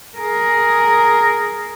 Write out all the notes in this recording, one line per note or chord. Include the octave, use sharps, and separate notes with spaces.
G#4 A#4